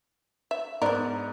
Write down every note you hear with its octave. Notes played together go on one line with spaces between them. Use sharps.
E5
G#2 B3 D4 A#4 D5